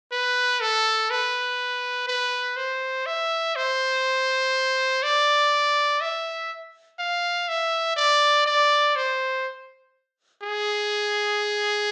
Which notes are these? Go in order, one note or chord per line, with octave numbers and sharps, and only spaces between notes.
B4
A4
B4
B4
C5
E5
C5
D5
E5
F5
E5
D5
D5
C5
G#4